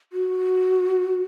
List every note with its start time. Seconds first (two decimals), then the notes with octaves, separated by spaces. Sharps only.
0.13 F#4